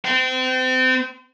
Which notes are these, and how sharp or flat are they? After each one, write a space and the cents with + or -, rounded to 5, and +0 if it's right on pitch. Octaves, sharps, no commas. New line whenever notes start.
C4 -30